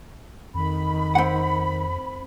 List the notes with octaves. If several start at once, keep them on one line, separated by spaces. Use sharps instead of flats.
F2 D#3 B5
C4 F#5